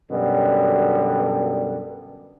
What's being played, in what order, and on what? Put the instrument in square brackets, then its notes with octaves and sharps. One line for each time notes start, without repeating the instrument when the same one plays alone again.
[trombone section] F#2 B2 D3 G3